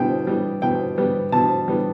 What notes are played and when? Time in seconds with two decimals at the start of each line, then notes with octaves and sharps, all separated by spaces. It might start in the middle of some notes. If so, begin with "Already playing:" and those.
Already playing: B2 G3 B3 E4 G5
0.27 G3 B3
0.62 B2 G5
0.98 G3 B3
1.32 B2 A5
1.68 G3 B3